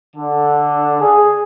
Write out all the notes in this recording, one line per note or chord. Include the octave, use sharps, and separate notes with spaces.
D3
G#4